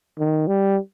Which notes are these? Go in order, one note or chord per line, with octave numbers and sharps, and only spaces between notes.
D#3
G3